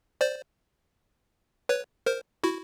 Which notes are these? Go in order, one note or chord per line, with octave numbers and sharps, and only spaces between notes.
C5 D5
B4 C#5
A#4 C5
E4 F#4